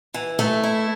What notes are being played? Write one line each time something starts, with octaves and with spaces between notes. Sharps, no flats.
E3
A3
E4